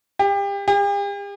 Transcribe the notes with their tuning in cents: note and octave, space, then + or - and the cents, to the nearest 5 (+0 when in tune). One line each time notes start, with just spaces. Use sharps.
G4 +30
G4 +45